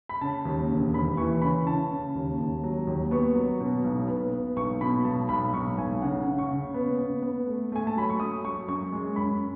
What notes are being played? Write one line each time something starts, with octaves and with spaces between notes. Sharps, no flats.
B5
C#3 A5
D#2
E1
D#2 B5
E3 C#6
C#3 B5
C#3 A5
C#3
D#2
D#2
F#3
D#2
B3 C#6
F#3
B2
B1
B3
B3
B1 C#6
B2 B5
B1 A5
B1 B5
B1 C#6
B1 G#5
C#3 F#5
C#3
C#6
C#3
B3
B3
B3
A3
A3 G#5
A5
F#3 B5
C#6
F#3 D#6
F#3 C#6
F#2 C#6
G#3
F#2 B5